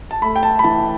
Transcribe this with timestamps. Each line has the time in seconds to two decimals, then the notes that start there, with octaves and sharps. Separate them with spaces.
0.11 A5
0.22 A3 B5
0.36 G5
0.43 A5
0.59 B5
0.64 E3 A5